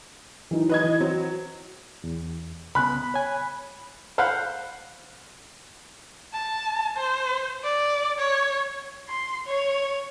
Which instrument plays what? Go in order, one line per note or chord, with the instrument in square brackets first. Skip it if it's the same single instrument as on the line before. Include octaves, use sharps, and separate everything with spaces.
[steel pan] E3 F#3 D#4
[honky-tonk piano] B4 D#5 G#6
[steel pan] E3
[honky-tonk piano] F#3 [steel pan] C4
[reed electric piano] E2
[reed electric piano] C2 C#3 B3 [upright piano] B5 F#6
[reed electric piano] C#5 G#5
[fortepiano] C5 F5 F#5 B5
[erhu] A5
C5
D5
C#5
C6
C#5